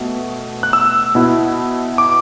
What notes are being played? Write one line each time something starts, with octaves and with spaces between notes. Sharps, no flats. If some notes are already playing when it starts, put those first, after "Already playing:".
Already playing: B2 A3
F#6
E6
B2 B3 E4
D6